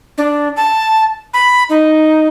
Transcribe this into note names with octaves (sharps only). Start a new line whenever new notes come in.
D4
A5
B5
D#4